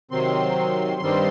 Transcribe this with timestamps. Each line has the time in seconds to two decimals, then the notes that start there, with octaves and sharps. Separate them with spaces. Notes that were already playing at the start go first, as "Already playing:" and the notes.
0.11 C3 D#3 F#3 C4 C6
1.01 G2 D#3 G3 C4